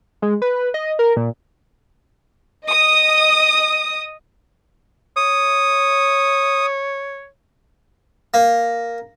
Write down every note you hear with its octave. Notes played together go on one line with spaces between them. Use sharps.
G#3
B4
D#5
A#4
A#2
D#5 D#6
C#5 D#6
A#3